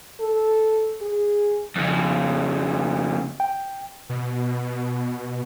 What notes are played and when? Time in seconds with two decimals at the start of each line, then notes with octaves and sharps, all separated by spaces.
0.20 A4
1.01 G#4
1.76 F2 C#3
3.40 G5
4.09 B2